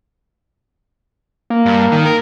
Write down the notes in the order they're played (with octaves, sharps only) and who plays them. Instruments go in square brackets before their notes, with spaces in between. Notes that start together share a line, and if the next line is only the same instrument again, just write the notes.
[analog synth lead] A#3
[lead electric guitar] G2
D#3
A#4